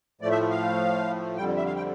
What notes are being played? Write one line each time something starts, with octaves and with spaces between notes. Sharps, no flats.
A2 F3 A3 D5
E5
F5
F2 D3 G3 G5
E5
F5
G5